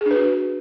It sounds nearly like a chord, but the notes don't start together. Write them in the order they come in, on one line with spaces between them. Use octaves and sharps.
G#4 D4 B4 F#4